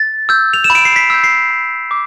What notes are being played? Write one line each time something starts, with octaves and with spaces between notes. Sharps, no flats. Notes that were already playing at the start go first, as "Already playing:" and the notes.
Already playing: A6
E6 G6
F7
E7
B5
D7
C7
B6
E6 G6
C7
B5
D6